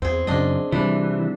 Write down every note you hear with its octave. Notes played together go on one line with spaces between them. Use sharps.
E2 C4 G#4
F#2 C#3 C4 D4 D#5
C3 E3 G3 D4